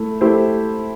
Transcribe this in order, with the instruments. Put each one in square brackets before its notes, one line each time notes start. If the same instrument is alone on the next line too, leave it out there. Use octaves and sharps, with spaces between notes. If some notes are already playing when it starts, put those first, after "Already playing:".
Already playing: [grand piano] A3 E4
A3 E4 G4 C5